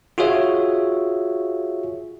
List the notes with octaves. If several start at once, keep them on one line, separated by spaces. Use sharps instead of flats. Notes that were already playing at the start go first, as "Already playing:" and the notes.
F4 F#4 G#4 C#5 E5